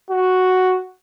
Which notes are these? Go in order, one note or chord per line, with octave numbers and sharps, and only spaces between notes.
F#4